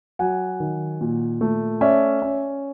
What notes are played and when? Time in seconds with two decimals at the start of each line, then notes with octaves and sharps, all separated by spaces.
0.19 F#3 F#5 G#5
0.60 D#3
1.01 A#2
1.41 A3
1.81 C#4 D5 E5
2.22 C#4